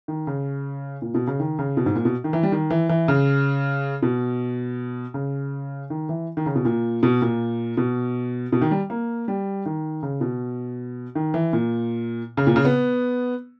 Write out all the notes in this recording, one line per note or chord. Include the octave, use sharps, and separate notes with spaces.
D#3
C#3
A#2
B2
C#3
D#3
C#3
B2
G#2
A#2
B2
D#3
E3
G3
D#3
E3
E3
C#3
B2
C#3
D#3
E3
D#3
C#3
B2
A#2
B2
A#2
B2
B2
D#3
G3
A#3
G3
D#3
C#3
B2
D#3
E3
A#2
C#3
A#2
C#3
B3